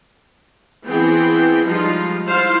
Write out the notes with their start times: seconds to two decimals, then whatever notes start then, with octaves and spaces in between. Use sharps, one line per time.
0.85 E3 B3 C4 G#4 G5
1.65 F3 G3 G#3 D#4 F4
2.28 E4 F4 C5 F5